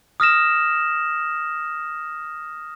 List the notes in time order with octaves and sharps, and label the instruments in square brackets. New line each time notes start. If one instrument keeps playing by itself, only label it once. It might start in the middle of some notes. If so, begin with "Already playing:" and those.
[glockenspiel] D#6 F6 A#6 E7